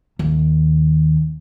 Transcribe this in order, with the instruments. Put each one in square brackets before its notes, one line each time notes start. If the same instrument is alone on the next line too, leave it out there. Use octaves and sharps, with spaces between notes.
[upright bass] D#2